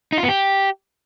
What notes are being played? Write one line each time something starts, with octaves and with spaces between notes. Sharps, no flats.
D#4
F4
B3
G4